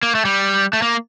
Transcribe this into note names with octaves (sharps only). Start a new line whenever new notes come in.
A#3
A3
G3
A3
A#3